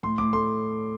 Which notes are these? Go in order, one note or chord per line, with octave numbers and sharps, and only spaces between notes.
A2 C6
A2 D6
A3 C6